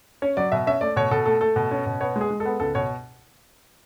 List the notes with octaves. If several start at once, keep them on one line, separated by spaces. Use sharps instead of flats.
C#4 C#5
F#3 D5
B2 E5
C#4 E5
A3 D5
B2 C#5
B2 A4
A3 A4
A3 A4
B2
C#4
B2
B3 C#5
G#3
G#4
G#3
A4
B3
C#2 A4
B2 C#5